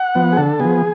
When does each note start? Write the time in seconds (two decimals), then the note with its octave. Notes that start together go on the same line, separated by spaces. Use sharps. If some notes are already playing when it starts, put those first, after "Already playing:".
Already playing: F#5
0.15 F3 B3
0.32 G#4
0.37 D3 A4
0.60 F3 B3 G#4